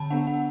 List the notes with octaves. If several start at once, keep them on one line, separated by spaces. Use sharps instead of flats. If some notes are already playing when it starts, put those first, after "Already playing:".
Already playing: D3 A5 B5
B3 D4 F#5
F#5